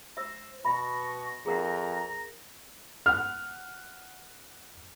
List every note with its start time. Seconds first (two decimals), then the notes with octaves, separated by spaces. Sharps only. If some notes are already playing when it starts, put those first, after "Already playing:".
0.17 C5 E5 E6
0.65 B2 E5 B5 C#6 A#6
1.46 F2 G#4 A#4 F#5 A#5
3.06 F#5 F6